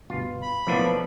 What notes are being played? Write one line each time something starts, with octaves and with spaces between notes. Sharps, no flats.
D2 G2 B2 F4
B5
B1 A2 E3 F3 A#3 B3 D4